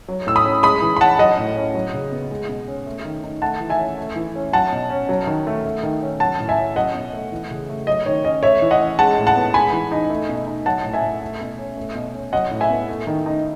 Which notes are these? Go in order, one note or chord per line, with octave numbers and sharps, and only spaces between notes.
F#3
A2 E6
B5 D#6
C#4
G#3 B5 D#6
E3
B5
C#4 F#5 A5
F#3 D#5 F#5
A2
C#4
F#3
C#3
B3
G#3
B2
C#4
A3
D#3
D#4
A3 F#5 A5
E3
E5 G#5
C#4
A3
E3
C#4
F#3 F#5 A5
B2
C#4
F#3
D#3
A3
A3
D#3
C#4
F#3 F#5 A5
A2
E5 G#5
C#4
F#3 D#5 F#5
B2
A3
E3
C#3
A3
F#3 D#5
D#3 C#5
C#4 D#5
A3 C#5 E5
E3
D#5 F#5
C#4
G#3 F#5 A5
A2
F#5 A5
B3
G#3 G#5 B5
E3
D#4
A3
B2
D#4
F#3 F#5 A5
A2
E5 G#5
A3
A3
B2
C#4
A3
B2
C#4
F#3 D#5 F#5
A2
E5 G#5
B3
A3
D#3
D#4